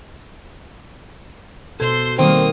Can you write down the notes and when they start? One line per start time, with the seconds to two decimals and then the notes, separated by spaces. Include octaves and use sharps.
1.80 B2 A4 C5 C6 G#6
2.19 D#3 G3 A#3 C4 D#6